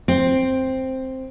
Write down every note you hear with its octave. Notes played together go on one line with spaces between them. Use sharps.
C4